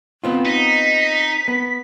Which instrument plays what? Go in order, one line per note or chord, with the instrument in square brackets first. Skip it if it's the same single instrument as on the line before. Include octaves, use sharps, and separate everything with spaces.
[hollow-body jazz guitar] B3 C4 F4
[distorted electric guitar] D#4 [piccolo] B6
[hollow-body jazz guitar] B3